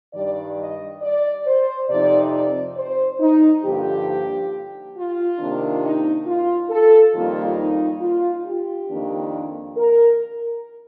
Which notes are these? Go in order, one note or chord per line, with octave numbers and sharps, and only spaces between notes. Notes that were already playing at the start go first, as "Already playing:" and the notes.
G2 D#3 G3 D5
D#5
D5
C5
F2 C3 F3 C4 D#4 D5
D5
C5
D#4
G2 D3 F3 A#3 G4
F4
C3 D#3 A#3 D4
D#4
F4
A4
F2 D#3 G3 A#3 F4
D#4
F4
G4
F2 D#3 A#3 D4
A#4